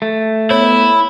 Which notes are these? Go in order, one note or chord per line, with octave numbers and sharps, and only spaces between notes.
A3
B3 E4 C#5